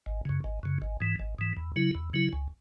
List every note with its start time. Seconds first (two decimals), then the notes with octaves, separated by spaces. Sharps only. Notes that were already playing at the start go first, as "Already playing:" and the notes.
0.06 G#1
0.25 F#2 C#3
0.44 G#1
0.63 F#2 C#3
0.82 G#1
1.00 G#2 E3
1.19 G#1
1.39 G#2 E3
1.57 E2
1.76 C#3 F#3 E4
1.95 E2
2.13 C#3 F#3 E4
2.33 C#2